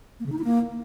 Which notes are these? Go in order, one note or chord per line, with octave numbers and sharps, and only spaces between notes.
A#3
C#3
D#4
E4
A#3